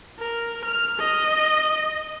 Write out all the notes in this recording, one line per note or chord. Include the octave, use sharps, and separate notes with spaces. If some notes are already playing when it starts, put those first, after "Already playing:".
A#4
F6
D#5